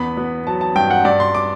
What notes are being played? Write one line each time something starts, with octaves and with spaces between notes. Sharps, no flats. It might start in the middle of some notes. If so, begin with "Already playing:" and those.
Already playing: E2 B3 B5
B3
F#3 A5
A5
G2 G5
F#5
G2 D5
C6
D6